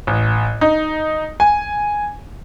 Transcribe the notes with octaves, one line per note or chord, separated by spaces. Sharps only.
A1
D#4
G#5